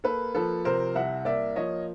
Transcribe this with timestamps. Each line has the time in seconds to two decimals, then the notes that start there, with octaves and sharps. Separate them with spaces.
0.04 A#3 A4 B4
0.35 F3 A4 B4
0.65 C3 A#4 C5
0.95 C2 E5 F#5
1.25 A#3 D5 E5
1.56 F3 C#5 D#5